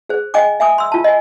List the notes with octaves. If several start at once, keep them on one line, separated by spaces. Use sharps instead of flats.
G#4 C5
D#5 G5 G#5 D6
E5 G#5 D6 D#6
C6 E6
F4 A5
D#5 G#5